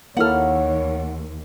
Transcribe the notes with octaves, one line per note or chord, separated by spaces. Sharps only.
D#2 A#3 E4 A4 C#5 F#5 F6